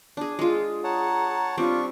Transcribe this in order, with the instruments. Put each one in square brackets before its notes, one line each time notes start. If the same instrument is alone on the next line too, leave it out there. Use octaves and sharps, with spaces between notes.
[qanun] D4 G#4
[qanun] G#3 F4 [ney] G#4
[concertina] C#5 F#5 A5 [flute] A#5
[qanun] G3 C4 [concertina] D4 C#6 [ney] F4